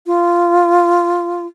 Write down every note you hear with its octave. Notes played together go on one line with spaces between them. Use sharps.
F4